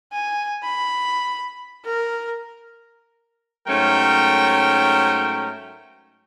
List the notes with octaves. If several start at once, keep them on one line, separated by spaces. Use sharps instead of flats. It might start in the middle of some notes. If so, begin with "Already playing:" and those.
G#5
B5
A#4
G#2 F#3 A3 C#4 A#4 G5